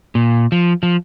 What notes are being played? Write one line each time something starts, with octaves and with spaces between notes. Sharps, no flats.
A#2
F3
F3